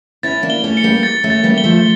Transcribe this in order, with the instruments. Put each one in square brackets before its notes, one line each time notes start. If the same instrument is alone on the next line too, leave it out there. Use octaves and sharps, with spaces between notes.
[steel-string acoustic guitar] C#4 E4 [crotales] A6
[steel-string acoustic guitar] A#3 D4
[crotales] G7
[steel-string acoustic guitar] A3 C#4
[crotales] C#7
[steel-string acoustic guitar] G3 A#3
[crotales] A6
[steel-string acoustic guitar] A3 C#4
[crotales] A6
[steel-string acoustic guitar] G3 A#3
[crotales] G7
[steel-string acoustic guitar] F3 A3